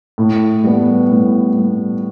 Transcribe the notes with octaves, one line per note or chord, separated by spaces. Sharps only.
A2
G3 B3
A2
G3 B3